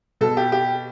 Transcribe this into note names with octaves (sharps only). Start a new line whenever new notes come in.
B2 A4
G4
G4